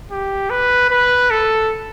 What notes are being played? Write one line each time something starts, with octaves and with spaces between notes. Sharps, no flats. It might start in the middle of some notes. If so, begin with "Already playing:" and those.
G4
B4
B4
A4